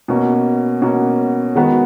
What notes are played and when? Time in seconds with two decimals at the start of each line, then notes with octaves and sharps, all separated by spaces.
0.08 B2 A#3 C#4 F#4
0.81 B2 A#3 C#4 F#4
1.55 D#3 G#3 B3 F#4 B4